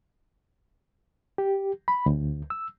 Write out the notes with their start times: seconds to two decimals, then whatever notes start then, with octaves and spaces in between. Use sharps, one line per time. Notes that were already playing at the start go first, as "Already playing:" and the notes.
1.38 G4
1.88 B5
2.06 D2
2.50 E6